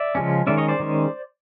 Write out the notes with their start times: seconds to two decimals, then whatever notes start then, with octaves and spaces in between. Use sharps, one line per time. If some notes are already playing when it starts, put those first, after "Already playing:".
Already playing: D5 E5
0.15 C#3 F3 G#3 C#4
0.47 D#3 G#3 C#4 D5 E5
0.57 C#5 D#5
0.68 C5 D5
0.80 D#3 G#3 C#4